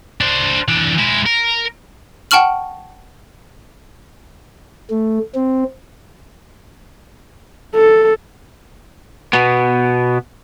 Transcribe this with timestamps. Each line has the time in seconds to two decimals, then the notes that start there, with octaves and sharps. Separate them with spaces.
0.21 D4 C5
0.68 E3 D4
0.98 G#3 E4
1.26 A#4
2.31 F#5 G5 A5 C#6 F6 F#7
4.90 A3
5.35 C4
7.75 A4
9.33 B2 B3